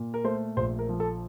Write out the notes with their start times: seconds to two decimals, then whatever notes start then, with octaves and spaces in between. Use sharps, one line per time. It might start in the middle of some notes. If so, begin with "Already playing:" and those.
Already playing: A#2
0.14 A#4
0.24 A3 C5
0.57 A#1 C5
0.79 A#4
0.89 F3
1.00 A4